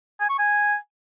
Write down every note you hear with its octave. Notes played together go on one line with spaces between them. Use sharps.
G#5
C#6
G#5